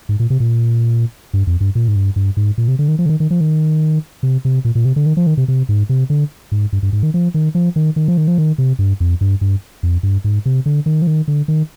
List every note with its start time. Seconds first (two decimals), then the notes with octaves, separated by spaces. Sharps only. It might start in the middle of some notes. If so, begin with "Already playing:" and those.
0.09 G#2
0.20 A#2
0.30 C3
0.40 A#2
1.34 G2
1.47 F2
1.61 G2
1.75 A#2
1.88 G#2
1.96 G2
2.16 G2
2.37 G#2
2.58 A#2
2.68 C3
2.79 D3
2.88 D#3
2.99 F3
3.06 D3
3.09 D#3
3.20 D#3
3.31 F3
3.41 D#3
4.23 C3
4.45 C3
4.65 A#2
4.75 A#2
4.85 C3
4.96 D3
5.06 D#3
5.17 F3
5.27 D#3
5.37 C3
5.48 C3
5.69 G#2
5.89 C3
6.10 D3
6.52 G#2
6.73 G2
6.83 G2
6.93 G#2
7.03 D#3
7.14 F3
7.34 D#3
7.55 F3
7.76 D#3
7.96 D#3
8.08 F3
8.17 D#3
8.28 F3
8.38 D#3
8.58 C3
8.79 G2
9.00 F2
9.21 G2
9.41 G2
9.83 F2
10.03 G2
10.24 G#2
10.46 C3
10.66 D3
10.86 D#3
11.02 F3
11.07 D#3
11.28 D3
11.48 D#3